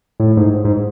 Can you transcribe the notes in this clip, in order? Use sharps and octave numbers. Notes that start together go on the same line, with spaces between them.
A2
G#2
G#2